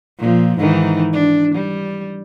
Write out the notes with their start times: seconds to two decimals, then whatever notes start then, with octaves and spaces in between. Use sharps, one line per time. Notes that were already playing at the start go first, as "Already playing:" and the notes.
0.19 A#2 F3
0.58 G#2 D#3 E3
1.13 D4
1.55 G3